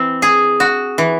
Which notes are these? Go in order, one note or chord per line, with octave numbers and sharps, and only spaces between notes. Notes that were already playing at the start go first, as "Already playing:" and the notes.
Already playing: E3 C4
G#4
F#4
E3